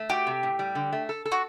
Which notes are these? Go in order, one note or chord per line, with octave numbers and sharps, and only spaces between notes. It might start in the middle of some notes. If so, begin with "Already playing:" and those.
Already playing: A3
F#4 G4
C3
A2
G3
D3
A3
A4
A4
F#4